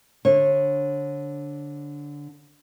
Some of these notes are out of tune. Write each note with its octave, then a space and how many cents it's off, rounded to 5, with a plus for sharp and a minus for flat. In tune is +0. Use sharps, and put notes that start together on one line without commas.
D3 -10 D4 +0 C#5 -30